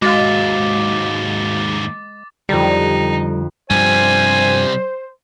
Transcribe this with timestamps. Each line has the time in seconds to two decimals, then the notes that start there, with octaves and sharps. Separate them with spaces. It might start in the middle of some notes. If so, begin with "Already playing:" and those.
0.02 D#2 G#2 G#3 F#4 F5 D6 A6
2.49 F2 D3 G3 D#4
3.70 G2 C3 F3 G3 C5 G#5